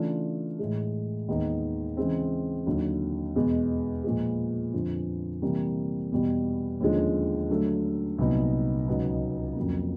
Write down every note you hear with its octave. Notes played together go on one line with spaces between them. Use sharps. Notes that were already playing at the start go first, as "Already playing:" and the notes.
Already playing: C#3 E3 A3 D4 F4
A2 E3 G#3
D#2 D#3 G#3 B3 D#4
C#3 E3 G#3 C4
D#2 D3 F#3
E2 B2 G#3
A#2 F3 G#3
F2 D3 F3
C3 E3 G3 A#3
E2 B2 G3
D#2 D3 F3 G#3 C#4
D3 F#3 A3
C2 A#2 F#3 B3 D#4
C#2 B2 F#3 B3 D#4
F2 C#3 F#3 A#3